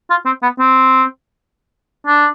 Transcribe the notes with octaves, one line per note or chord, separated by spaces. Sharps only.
F4
C4
B3
C4
D4